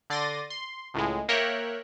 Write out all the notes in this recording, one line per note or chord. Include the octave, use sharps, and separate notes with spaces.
D3 D5 C6 A6 A#6 D#7
C6
C#2 A2 G#3
A#3 A#4 C#5 E5 G5 F#6